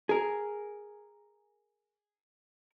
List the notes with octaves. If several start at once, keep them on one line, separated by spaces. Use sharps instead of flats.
G#4 A#4